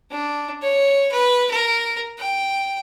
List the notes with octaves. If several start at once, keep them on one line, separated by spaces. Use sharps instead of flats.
D4
C#5
B4
A#4
G5